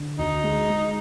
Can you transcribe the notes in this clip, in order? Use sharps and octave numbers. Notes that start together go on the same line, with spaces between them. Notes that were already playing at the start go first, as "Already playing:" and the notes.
Already playing: D3
D2 D#4
G#3
G#3